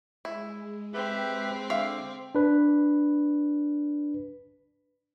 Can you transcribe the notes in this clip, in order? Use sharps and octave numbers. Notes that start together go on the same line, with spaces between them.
G#3 E4
C4 G4 B4 E5
D3 E5 F5 D6
D4 B4